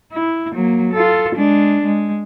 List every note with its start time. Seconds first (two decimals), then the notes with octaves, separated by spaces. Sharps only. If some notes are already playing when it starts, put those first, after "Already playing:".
0.12 E4
0.53 F#3 A#3
0.94 F4 A4
1.36 G#3 D4
1.85 G#3